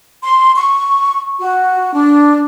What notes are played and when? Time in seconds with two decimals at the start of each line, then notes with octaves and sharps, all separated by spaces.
0.23 C6
0.57 C#6
1.39 F#4
1.94 D4